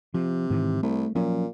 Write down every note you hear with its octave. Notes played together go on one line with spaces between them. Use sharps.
C3 F3
G#2 D#3 E3
C2 A3
A#2 F3 F#3 C#4